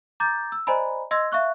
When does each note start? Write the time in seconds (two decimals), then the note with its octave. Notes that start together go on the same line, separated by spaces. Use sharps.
0.20 A#5 D6 G6 A6
0.52 E6
0.67 C5 D5 D#5 G#5 A#5 B5
1.11 D#5 C6 E6 G#6 A#6
1.32 E5 F5 C#6 F#6